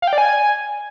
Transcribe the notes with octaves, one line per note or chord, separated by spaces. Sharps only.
F5
G5
D5
G#5